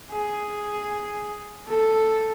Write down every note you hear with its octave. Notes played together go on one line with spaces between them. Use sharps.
G#4
A4